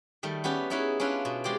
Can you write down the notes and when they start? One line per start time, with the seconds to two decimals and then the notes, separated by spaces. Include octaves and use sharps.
0.23 D#3 G3 A3
0.44 B3 C#4 G4 B4
0.70 C#4 D#4 E4 G#4 B4 C#5
1.00 C#4 D4 E4 F4 B4
1.25 B2
1.44 G#3 G4 C5 D5